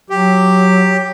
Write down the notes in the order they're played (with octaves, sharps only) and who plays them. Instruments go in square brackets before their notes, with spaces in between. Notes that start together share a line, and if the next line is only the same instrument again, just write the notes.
[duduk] F#3 [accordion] G4